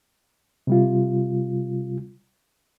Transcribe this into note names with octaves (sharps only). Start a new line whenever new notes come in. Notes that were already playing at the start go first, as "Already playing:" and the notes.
C3 G3 F4